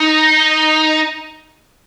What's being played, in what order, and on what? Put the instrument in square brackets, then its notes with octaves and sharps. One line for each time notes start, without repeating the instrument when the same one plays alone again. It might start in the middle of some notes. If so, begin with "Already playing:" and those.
Already playing: [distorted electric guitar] D#4